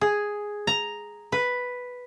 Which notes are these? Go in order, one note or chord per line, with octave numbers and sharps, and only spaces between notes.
G#4
A#5
B4